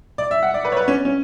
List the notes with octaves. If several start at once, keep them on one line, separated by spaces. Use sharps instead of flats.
D5
E5
F#5
D5
B4
C#5
B4
C#4
C#4